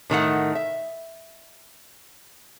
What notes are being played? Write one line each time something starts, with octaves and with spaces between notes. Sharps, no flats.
A2 D#3 A3 F#5
E5